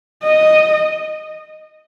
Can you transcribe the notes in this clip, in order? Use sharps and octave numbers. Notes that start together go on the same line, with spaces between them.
D#5